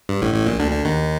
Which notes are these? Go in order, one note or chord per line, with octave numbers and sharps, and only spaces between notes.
G2
A1 A2
A1 A2
A#1 A#2
D2 D3
D3
D#2 D#3